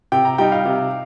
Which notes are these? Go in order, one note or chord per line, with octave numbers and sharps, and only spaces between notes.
C3 G5
A#5
G3 D#4 G5
F5
C3